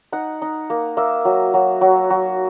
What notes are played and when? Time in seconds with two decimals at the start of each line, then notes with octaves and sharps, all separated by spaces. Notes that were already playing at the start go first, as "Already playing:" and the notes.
0.12 D#4 F#5
0.42 D#4
0.70 A#3
0.97 A#3 E5
1.25 F#3
1.54 F#3
1.81 F#3
2.10 F#3